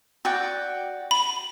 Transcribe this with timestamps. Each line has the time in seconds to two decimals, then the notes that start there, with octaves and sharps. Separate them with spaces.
0.25 F#4 D5 G5
1.11 B5